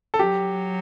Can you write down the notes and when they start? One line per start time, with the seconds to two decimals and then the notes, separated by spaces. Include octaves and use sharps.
0.14 A4
0.19 F#3 G4